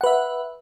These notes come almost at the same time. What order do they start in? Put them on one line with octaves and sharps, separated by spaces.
F#5 B4 E5